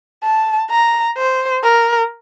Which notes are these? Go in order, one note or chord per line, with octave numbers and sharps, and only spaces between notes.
A5
A#5
C5
A#4